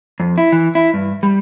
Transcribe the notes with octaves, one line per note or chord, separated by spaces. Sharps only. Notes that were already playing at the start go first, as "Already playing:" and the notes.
F2
E4
E3
E4
G2
G3